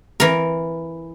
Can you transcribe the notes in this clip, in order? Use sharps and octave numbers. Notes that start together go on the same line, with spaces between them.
E3 A#4